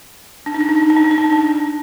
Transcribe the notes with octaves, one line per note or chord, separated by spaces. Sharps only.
D4
D#4
D4
D#4
D4
D#4
D4
D#4
D4
D#4
D4
D4